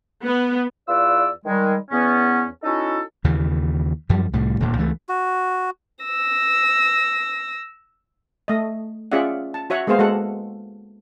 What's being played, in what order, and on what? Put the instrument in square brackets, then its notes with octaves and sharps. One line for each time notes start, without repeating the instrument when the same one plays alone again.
[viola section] B3
[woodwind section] E2 F4 B4 D5 E6
D#3 G3 G#3
E2 B3 C#4
C#4 D#4 E4 F#4 A4
[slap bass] D#2 C#3 E3
F#2 F3 G3
C2 A2 G3
D#1 D2 A#2
C#2 E3 A3
[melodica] F#4
[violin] E6 A#6
[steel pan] A3 D#5
C#4 F4 G#4 D5 E5 F#5
A5
F#4 C#5 E5 F#5
G#3 A#3 B3 G#4 C5 F5
G#3 F#4 A4 F#5